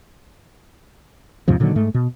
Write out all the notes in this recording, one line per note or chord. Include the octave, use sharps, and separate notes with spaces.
D#2 G#2 C3 F3
A#2 D3 D#3 F#3
G#2 A3
B2